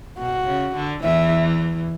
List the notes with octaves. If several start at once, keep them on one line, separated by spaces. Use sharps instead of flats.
B2 F#4
C#3
D3
E2 E3 E5